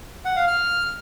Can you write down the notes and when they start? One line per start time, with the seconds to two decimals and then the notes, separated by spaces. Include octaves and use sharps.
0.25 F#5
0.36 F5
0.47 F6